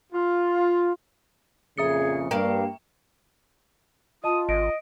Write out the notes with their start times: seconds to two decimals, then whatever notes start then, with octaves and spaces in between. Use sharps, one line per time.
0.13 F4
1.78 F2 A#2 C#3 G#4 E5 D#6 C#7
2.31 G2 A#3 D5 F5 G5
4.24 F4 D#5 A5 D#6
4.49 G#1 D#5 D7